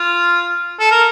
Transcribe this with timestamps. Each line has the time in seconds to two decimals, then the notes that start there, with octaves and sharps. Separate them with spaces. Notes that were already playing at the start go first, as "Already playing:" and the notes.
Already playing: F4
0.80 A4
0.91 A#4